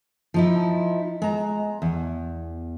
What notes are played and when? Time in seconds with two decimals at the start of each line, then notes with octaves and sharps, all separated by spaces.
0.34 F3 D#4 E4
1.22 G#3 A#5
1.82 E2